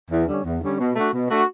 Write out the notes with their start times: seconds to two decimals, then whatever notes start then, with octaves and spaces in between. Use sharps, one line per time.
0.11 E2
0.27 D3 G3 C#4
0.44 E2
0.61 D3 G3 C#4
0.78 B2
0.95 A3 D4 F#4
1.12 B2
1.29 A3 D4 F#4